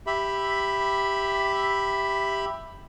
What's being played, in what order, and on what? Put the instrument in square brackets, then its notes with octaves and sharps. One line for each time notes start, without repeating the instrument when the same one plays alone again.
[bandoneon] G4 E5 B5